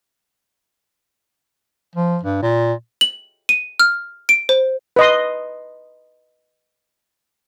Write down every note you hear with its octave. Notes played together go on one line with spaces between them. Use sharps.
F3
G2
A#2
F#7
D#7
F6
D7
C5
B4 D#5 C6